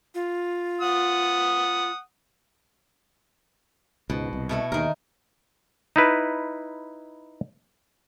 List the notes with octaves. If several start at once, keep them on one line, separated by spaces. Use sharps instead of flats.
F4
F#5 D#6
C#2 G#2 B2
C2
B2 A3 E4
D#2 D#3 A#4
D#4 E4 B4